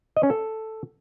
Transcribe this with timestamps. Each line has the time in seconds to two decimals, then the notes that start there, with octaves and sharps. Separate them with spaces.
0.17 D#5
0.23 C#4
0.30 A4